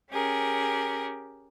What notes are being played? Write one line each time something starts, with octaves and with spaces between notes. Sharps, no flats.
C#4 G4 G#4 A#4